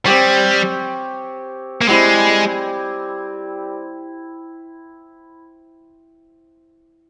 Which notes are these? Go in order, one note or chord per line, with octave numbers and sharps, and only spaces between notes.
G3 C4 G4 C#5
A#3
G3 G#3 C4 E4 G4